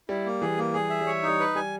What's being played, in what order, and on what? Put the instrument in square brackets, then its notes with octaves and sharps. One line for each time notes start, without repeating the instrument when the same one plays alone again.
[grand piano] G3 [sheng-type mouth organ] E4
[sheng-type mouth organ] A#3
[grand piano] E3 [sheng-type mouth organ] G#4
[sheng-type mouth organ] A#3
[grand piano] G3 [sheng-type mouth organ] G#4
[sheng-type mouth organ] E5
[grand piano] G3
[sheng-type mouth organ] C#5
D#4
[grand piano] G3
[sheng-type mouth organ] B4
[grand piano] G3 [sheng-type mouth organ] G#5